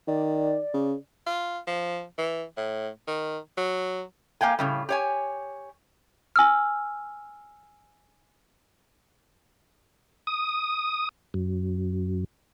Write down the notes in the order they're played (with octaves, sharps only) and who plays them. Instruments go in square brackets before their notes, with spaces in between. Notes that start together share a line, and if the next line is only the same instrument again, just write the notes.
[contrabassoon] D#3 [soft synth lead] D5
[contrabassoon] C#3
[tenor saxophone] F4
F3
E3
A2
D#3
F#3
[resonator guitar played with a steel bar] A#3 F5 G5 G#5
A2 C#3 G3
G4 C#5 G#5
[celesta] G#5 E6 F6
[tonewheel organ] D#6
F#2